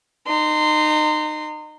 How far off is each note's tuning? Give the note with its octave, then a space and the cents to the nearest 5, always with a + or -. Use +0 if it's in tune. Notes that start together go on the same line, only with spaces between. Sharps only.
D#4 -25 C6 -15